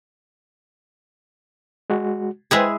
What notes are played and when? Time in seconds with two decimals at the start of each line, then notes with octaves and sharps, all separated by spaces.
1.90 G#3 F#4
2.51 G#3 E4 G#4 B4 C5 G5